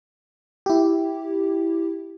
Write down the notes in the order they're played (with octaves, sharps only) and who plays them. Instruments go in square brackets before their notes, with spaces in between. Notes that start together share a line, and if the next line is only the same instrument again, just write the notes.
[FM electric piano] E4 G4